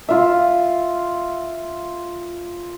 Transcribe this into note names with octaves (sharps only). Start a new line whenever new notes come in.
F4 E5